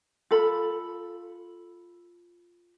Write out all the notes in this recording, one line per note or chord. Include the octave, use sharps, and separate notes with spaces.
F4 A4 B5